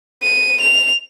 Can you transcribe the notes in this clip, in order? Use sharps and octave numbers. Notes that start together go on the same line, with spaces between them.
D#7
F7